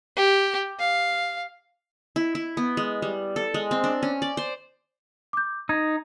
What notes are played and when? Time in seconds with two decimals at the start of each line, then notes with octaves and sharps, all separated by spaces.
0.16 G4
0.79 F5
2.16 E4
2.35 E4
2.57 B3
2.77 G#3
3.02 G3
3.36 A4
3.54 G#3
3.71 C4
3.84 D4
4.03 C#4
4.22 D5
4.37 C5
5.33 D6 G6
5.69 D#4 G#6